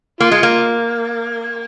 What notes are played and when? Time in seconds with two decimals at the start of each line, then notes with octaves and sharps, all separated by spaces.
0.20 A#3 F4
0.31 G#3
0.43 A#3